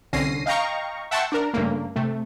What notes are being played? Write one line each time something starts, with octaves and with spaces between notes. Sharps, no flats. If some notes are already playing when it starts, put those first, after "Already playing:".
C2 D3 C#4 A#6 C7 D#7
D#5 F5 G5 A#5 C#6
E5 F#5 G5 A5 C6 C#6
D4 A#4
G2 C#3 A3 A#3
C3 A3